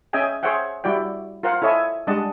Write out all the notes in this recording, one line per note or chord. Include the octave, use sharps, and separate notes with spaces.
C#4 G#4 D#5 E5 G5 G#5
G#4 C5 C#5 E5 F#5 G5
G3 E4 F#4 D5 G5
F4 A#4 C5 F5 F#5
E4 A4 C#5 D#5 E5 G#5
G3 G#3 D4 D#5 F#5 A5